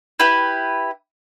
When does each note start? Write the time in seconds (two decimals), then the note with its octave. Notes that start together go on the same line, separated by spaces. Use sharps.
0.20 E4 G4 B4